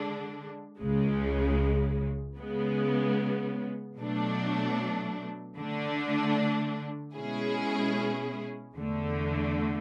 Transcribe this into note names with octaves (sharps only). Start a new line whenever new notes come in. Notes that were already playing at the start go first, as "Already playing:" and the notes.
Already playing: D3 G#3 D4
C#2 C#3 G#3
C#3 G#3 B3
B2 F#3 A3 D4
D3 A3 D4
B2 G#3 C#4 E4 G#4
E2 D3 A3